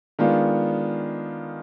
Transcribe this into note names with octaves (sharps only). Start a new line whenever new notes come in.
D#3 G#3 B3 D4 F4